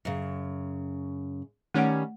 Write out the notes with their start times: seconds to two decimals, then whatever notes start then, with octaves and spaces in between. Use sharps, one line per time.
0.05 F#2 C#3
1.74 D#3 G3 A3 C#4 F#5